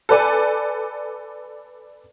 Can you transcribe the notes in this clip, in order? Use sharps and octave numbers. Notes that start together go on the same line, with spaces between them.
A4 B4 D5 G#5